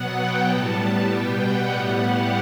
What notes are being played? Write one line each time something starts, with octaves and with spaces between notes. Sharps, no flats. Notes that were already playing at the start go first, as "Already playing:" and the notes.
Already playing: B2 F#3 B3 F#5
G5
A2 G3 B3 A5
A5
B2 G3 B3 G5
F#5
A2 G3 B3 F#5
G4